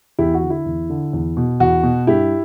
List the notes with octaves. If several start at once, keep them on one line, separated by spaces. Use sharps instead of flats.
E2 E4 G4
F#4
D3
E4
E2
D3
E2
B2
E2 F#4
B2
G2 E4 G4